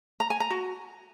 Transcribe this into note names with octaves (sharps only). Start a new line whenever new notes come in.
A#5
G#5
A#5
F#4